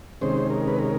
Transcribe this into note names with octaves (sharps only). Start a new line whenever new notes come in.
C3 D#3 G#3 C#4 C5
A#4
B4
A#4